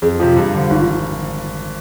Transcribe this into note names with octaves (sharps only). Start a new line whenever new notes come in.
F2 G#4
C3 F3 F4
G2
D3 F3
G#1 D#4
F4